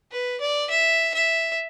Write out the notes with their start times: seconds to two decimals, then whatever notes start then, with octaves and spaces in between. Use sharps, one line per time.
0.11 B4
0.41 D5
0.70 E5
1.14 E5